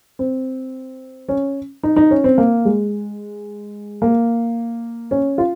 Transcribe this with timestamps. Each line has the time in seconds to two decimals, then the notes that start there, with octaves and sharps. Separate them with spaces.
0.19 C4
1.29 C#4
1.83 D#4
1.96 D#4
2.11 C#4
2.24 C4
2.38 A#3
2.65 G#3
4.02 A#3
5.11 C#4
5.38 F4